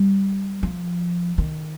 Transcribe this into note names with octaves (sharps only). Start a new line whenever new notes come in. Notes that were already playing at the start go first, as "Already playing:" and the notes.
Already playing: G3
F3
D#3